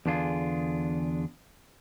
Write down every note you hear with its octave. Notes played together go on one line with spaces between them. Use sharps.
E2 D3 D4 F4 G#4